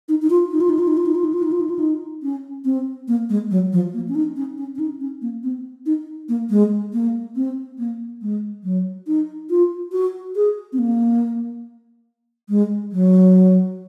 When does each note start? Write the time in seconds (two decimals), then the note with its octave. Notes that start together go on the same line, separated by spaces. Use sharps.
0.09 D#4
0.22 D#4
0.30 F4
0.51 D#4
0.61 F4
0.69 D#4
0.79 F4
0.88 D#4
0.97 F4
1.06 D#4
1.15 F4
1.24 D#4
1.33 F4
1.43 D#4
1.52 F4
1.61 D#4
1.70 F4
1.79 D#4
2.23 C#4
2.65 C4
3.08 A#3
3.30 G#3
3.51 F#3
3.73 F3
3.94 A#3
4.09 C#4
4.15 D#4
4.36 C#4
4.58 C#4
4.75 C#4
4.79 D#4
5.00 C#4
5.22 A#3
5.43 C4
5.86 D#4
6.29 A#3
6.50 G#3
6.93 A#3
7.36 C4
7.79 A#3
8.22 G#3
8.64 F#3
9.07 D#4
9.50 F4
9.92 F#4
10.35 G#4
10.73 C4
10.79 A#3
12.49 G#3
12.92 F#3